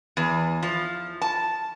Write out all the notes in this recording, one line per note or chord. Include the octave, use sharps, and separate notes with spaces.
E2
F3
A5